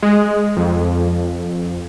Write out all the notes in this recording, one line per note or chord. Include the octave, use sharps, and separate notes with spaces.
G#3
F2